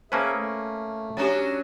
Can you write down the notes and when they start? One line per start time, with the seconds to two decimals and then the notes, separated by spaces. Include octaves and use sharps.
0.12 A#3 C#4 G#4 B4 C5 E5 A5 A#5
0.34 A3
1.17 F#3 C#4 D4 G4 C#5